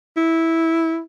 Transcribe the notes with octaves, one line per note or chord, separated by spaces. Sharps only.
E4